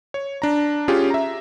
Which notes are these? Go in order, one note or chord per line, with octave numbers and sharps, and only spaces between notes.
C#5
D4 A#5
C#4 F4 G4 G#4
E5 A#5